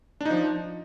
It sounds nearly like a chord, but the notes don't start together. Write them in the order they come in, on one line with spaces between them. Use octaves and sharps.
D4 D#4 F3